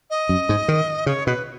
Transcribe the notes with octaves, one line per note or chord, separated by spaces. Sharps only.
D#5
F#2
G#2
D#3
C#3 C#5
B2 B4